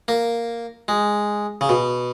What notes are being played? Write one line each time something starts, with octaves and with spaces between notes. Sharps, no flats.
A#3
G#3
C#3
B2